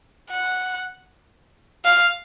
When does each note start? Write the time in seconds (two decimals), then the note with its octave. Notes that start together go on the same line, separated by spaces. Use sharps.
0.30 F#5
1.85 F5